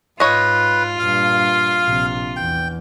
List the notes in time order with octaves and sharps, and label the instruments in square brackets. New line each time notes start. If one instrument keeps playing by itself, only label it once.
[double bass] G#2 [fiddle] F4 [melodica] B4 [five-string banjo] C#5 D#5
[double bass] G2 A#2 [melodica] F5
[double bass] A#1 C3
[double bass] E2 [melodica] G5